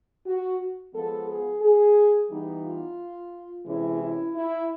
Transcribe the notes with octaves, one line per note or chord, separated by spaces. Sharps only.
F#4
F3 G#3 B3 A4
G#4
G#4
E3 G3 B3 D#4
F4
C3 E3 G#3 C#4 E4
E4
E4